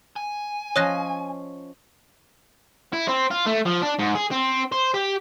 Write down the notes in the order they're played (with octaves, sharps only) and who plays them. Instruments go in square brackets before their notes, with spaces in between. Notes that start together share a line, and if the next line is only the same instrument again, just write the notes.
[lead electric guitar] G#5
[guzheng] F3 C#4 D#5 [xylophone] C#5 F#6 A#6
[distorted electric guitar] E4
C4
F4
A3
F3
D4
G#2
G#4
C4
C5
G4